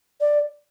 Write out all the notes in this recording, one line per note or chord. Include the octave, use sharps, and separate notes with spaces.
D5